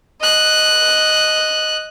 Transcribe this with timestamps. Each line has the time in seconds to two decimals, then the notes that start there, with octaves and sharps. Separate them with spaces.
0.21 D#5 F#6